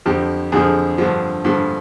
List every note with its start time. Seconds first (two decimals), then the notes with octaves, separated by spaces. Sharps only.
0.06 F2 D3 F3 G4
0.52 F2 D3 F3 G#4
0.98 G2 D3 F3
1.44 G2 D3 F3